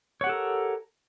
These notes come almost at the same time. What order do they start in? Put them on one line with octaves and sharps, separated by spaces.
C#5 F#5 G4 A4 A#4